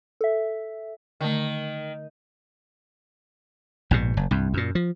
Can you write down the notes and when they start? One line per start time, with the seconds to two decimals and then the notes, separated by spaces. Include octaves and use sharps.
0.21 A4 E5
1.21 D3 D#3 A3
3.91 A#1 G#2 B2
4.17 F#1
4.31 C2 G2
4.54 F#2 A#2
4.75 F3